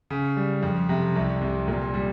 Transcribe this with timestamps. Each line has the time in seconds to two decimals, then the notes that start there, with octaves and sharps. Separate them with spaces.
0.10 C#3
0.37 G3
0.62 F2
0.89 C3
1.16 C2
1.42 C3
1.68 A#2
1.94 G3